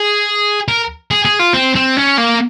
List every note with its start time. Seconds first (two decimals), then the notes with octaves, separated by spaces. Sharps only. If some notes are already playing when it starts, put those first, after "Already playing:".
Already playing: G#4
0.69 A#4
1.11 G#4
1.25 G#4
1.39 F4
1.53 C4
1.75 C4
1.97 C#4
2.18 A#3